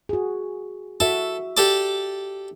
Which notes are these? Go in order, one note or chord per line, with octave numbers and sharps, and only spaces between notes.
F#4 G#4
F#4 A4 E5
G4 A4 D5